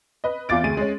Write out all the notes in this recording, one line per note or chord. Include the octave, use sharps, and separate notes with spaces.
B4 D#5
E2 F4 D6 A6 D7
D2 G#4 D#7
G#3 C#4